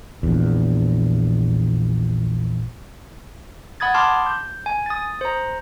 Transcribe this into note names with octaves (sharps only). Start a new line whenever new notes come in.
A#1 E2
F#5 B5 D#6 G#6 A6
A5 B5 C6 D6 F6
G6
G#5
D#6 A6
C5 A#5